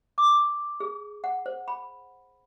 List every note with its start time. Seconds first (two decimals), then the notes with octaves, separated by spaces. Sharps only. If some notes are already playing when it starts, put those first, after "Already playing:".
0.18 D6
0.80 G#4
1.24 F#5
1.46 C5
1.68 B5